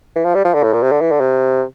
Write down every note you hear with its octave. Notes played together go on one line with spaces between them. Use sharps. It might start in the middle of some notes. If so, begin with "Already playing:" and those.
E3
F3
G3
F3
D3
A2
A#2
C3
D3
E3
D3
C3